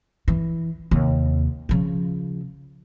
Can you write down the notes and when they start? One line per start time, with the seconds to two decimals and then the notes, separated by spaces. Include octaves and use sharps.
0.28 E3
0.91 D#2 C3
1.69 C#3 F3